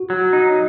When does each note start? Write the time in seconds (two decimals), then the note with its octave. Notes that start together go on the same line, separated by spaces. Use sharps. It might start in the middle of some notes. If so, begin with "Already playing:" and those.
Already playing: F#4
0.10 F#3
0.33 D#4